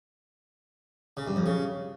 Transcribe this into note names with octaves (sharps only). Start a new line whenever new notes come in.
C#3
G2
F2
C#3